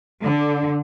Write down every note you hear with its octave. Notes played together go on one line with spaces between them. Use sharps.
D3